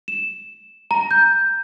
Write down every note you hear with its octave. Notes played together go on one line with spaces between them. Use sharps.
E7
A#5
G6